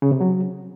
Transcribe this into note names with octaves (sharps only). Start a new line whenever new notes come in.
C#3
C3
F#3